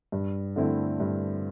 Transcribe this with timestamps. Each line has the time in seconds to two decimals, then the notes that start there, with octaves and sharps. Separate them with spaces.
0.12 G2
0.56 D3 A3 C4 E4
1.00 G2